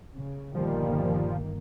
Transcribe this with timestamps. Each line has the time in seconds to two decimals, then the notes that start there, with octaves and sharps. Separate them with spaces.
0.15 C#3
0.55 G1 A#2 D#3 F3 G3 A#3